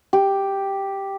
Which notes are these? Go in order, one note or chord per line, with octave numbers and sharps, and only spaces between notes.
G4